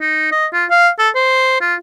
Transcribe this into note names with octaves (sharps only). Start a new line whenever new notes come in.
D#4
D#5
F4
F5
A4
C5
F4